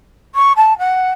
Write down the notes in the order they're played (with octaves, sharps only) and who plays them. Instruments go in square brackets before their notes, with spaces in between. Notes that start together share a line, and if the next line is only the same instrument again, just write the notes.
[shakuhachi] C#6
A5
F#5